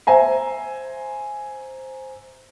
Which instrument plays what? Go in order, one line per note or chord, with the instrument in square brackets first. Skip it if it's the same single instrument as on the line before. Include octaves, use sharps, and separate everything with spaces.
[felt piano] C5 E5 G#5 A#5